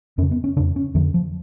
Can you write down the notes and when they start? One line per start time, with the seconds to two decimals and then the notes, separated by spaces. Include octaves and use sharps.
0.18 F2 C#4
0.22 C#3
0.31 B3
0.44 C#4
0.57 F2 C#3 D4
0.76 C#4
0.95 F2 D3 F3
1.14 F3